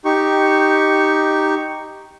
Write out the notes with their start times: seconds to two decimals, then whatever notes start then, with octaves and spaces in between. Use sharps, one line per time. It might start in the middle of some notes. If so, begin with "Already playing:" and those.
0.05 D#4 G4 C#6